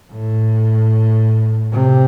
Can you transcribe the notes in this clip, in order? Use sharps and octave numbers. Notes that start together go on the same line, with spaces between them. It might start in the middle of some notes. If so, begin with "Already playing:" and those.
A2
C3